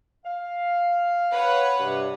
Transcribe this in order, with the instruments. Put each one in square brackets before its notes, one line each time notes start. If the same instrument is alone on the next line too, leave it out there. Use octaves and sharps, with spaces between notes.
[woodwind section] F5
[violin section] B4 C#5 F#5
[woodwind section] G2 C3